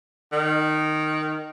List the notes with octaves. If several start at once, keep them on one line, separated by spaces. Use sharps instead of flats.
D#3